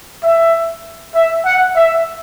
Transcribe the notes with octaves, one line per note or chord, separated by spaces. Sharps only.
E5
E5
F#5
E5